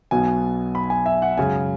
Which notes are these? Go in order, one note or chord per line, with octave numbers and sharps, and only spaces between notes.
B1 B2 B3 G#5
B5
G#5
E5
F#5
F#2 C#3 G#3 G#5